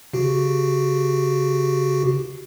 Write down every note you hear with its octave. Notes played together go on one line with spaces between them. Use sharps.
C#3 F#4 G4